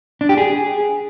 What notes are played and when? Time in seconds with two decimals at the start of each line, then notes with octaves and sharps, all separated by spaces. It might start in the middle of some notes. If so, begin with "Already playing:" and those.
0.21 D4
0.29 G4
0.37 G#4